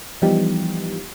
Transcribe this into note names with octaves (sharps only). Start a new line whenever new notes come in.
E3 F3 G3 B3 D#4 G4